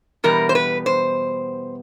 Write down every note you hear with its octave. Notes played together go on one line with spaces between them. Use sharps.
E2 B2 G3 B3 A#4
C5
B4
C5